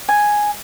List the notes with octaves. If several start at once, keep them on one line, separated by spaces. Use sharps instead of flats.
G#5